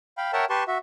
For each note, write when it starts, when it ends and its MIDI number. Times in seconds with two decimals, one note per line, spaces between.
0.18 0.32 77
0.18 0.32 79
0.18 0.32 83
0.33 0.45 70
0.33 0.45 73
0.33 0.45 76
0.33 0.45 78
0.33 0.45 79
0.33 0.45 81
0.50 0.64 67
0.50 0.64 71
0.50 0.64 81
0.50 0.64 84
0.50 0.64 85
0.67 0.78 66
0.67 0.78 76